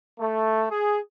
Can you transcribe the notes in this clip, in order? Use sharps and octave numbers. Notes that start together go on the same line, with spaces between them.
A3
G#4